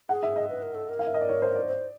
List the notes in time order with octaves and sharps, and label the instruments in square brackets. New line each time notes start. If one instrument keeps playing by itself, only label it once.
[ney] G#4 [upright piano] F#5
[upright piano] E5
D#5
[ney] B4
A#4
A4
A#4
[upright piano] F5
E5
D#5
D5
C#5
C5
D5
[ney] C5